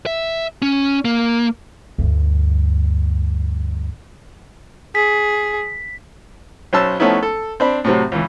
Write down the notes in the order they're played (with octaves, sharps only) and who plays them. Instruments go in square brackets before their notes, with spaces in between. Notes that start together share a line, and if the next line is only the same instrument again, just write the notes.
[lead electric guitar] E5
C#4
A#3
[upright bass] D2 G2
[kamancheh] G#4 [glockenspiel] B6
[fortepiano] B1 C#4 C5 A5 E6
F3 A3 B3 C#4 D#4 E4
A4
C4 D4 B5
A2 C3 F#3
C#2 E3